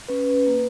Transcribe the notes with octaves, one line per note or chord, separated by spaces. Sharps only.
C#4 B4
A#3